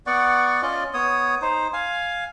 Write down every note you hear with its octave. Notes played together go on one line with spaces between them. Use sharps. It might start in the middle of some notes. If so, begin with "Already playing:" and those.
B3 D5 F#5 C#6
C#4 F4 D5 D#5
B3 C#5 D#6
D#4 C5
F5 G#5